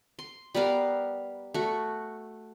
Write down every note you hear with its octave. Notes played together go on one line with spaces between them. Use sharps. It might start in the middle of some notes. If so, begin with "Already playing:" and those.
C6
G3 B3 A#4 F5
A3 F#4